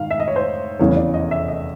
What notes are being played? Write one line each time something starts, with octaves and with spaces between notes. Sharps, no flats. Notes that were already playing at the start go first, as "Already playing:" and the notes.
Already playing: G#2 D#3 F5
E5
D#5
C#5
C5
F1 E2 C#3 E3 C#5
D5
D#5
E5
D#5